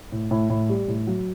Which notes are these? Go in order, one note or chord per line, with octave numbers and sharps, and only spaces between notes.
A2
A2
A2
G3
A2
F#3